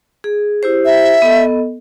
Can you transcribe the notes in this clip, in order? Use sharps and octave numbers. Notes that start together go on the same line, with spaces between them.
G#4
E4 G4 C5
E5
B3 A4 D#5